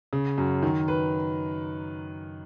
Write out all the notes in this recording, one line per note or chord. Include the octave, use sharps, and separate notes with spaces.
C#3
F#2
D#3
B4